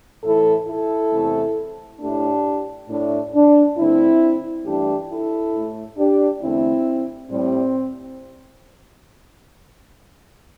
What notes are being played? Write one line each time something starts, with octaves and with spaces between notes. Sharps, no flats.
A2 E3 A3 E4 A4
E4 A4
E2 C3 A3
A2 A3 D4 G4
A2 A3 D4
D4
G2 D3 A3 C4 E4
G2 E3 A3 D4 G4
E4 A4
A2 A3
D4 G4
E2 D3 A3 C4 E4
A2 G3 C4